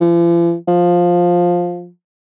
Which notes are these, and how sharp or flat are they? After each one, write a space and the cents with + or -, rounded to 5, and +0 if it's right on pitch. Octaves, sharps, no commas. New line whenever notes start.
F3 -45
F3 +10